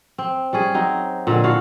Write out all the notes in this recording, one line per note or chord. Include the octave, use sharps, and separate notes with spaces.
C4
G3 C#4 G#4
F#3 C4 D#4
A#2 D3 G#3
E4 F#4 A4 F5